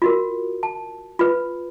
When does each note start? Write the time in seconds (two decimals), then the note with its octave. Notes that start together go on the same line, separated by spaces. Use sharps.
0.02 F4 F#4 A#4
0.63 A5
1.19 F4 B4